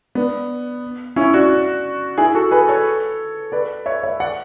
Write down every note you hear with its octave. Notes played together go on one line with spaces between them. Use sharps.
B3 D4
C#4 E4
D4 F#4
E4 G#4
F#4 A4
G#4 B4
A4 C#5
B4 D5
C#5 E5
C#5 E5
D5 F#5